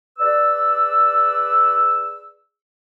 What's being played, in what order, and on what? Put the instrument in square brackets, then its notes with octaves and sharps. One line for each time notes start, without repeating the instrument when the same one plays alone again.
[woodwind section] G#4 B4 D5 E6